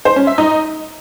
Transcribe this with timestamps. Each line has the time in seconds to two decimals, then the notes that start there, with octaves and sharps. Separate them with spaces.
0.05 C5
0.16 C#4
0.27 E5
0.38 D#4